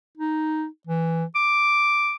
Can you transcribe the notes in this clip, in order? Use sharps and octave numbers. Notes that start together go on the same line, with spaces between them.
D#4
E3
D6